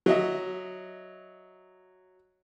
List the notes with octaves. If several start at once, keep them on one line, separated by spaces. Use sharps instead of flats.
F#3 D#5 E5